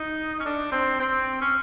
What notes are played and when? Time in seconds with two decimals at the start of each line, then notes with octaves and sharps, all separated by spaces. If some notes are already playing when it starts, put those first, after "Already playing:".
Already playing: D#4
0.40 C#4
0.45 D4
0.72 C4
1.00 C4
1.41 C#4